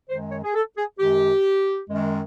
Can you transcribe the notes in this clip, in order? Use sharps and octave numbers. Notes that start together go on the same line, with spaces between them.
F#2 D#3 G#3 C5
C#5
G#4
A4
G#4
F#2 D#3 G#3 G4
F#2 D#3 G#3